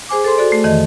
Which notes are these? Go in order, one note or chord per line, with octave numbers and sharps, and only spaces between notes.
G#4 C5 G#5 D6
A4 C5 C6
F#4 A4 D5
A3
F2 D#3 E3 D#5